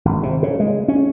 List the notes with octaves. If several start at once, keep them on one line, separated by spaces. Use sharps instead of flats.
G#1
C3
C#3
G#3
C#4